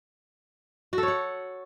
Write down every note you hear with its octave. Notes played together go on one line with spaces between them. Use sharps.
F#4
A4
C#5
F#5